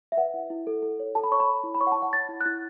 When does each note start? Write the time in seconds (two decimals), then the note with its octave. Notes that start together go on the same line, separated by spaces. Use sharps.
0.12 E5
0.17 B4 F#5
0.34 E4
0.50 E4
0.67 A4
0.82 A4
1.00 C#5
1.15 A4 A5
1.24 B5
1.32 C#5 C#6
1.40 B5
1.48 C#5
1.64 E4
1.75 B5
1.81 C#5 C#6
1.87 F#5
1.92 A5
1.97 C#5
2.02 F#5
2.13 C#5 A6
2.29 E4
2.41 F#6
2.46 E4 A6